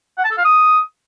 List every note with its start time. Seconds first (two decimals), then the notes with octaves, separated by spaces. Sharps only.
0.18 F#5
0.24 A5
0.31 A4
0.38 F5
0.44 D#6